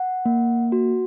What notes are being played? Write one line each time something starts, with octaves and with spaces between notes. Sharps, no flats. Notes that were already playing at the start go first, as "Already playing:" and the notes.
Already playing: F#5
A#3
F#4